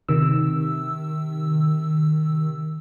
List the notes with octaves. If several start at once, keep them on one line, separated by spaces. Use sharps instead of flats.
C3 D#3 E6